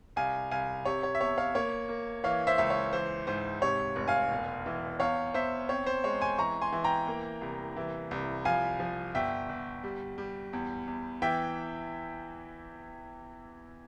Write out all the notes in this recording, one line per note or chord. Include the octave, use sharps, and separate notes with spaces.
C2 F5 G#5
C2 F5 G#5
C3 C#5
C#5
E5
E2 C#5
C#5 F5
A#3 C#5
A#3
E3 C#5 F5
C5 E5
C#2 E5
C#5
E3 C5
G#2 C5
C3 C#5
F1
F5 G#5
E1
E3
E2 C#5 F5
E2 C5 E5
C4 C#5
C5
G#3 C#5
G#5 C6
E3 A#5 C#6
G#5 C6
E3
G5 A#5
A#3
C2
E3
C2
F3 F5 G#5
F3
G1 E5 G5
G1
G3
G3
E2
E2
E3 E5 G5